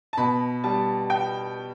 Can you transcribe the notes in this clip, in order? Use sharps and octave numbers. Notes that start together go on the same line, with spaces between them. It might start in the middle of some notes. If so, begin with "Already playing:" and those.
A5
B2 B5
G3 A5
G5